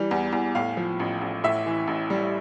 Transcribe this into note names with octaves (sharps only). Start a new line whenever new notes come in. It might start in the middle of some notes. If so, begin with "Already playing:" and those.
Already playing: E3 G3
E2
E2
A2 F5
F3
A1
A1
A2 E5
E3
A1
G3